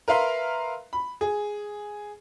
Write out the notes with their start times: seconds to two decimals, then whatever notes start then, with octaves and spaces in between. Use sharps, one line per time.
0.08 A#4 B4 E5 F5 C6 F6
0.93 B5
1.21 G#4